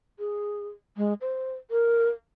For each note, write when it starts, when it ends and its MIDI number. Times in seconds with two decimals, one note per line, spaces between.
0.19 0.68 68
0.97 1.13 56
1.21 1.53 72
1.71 2.09 70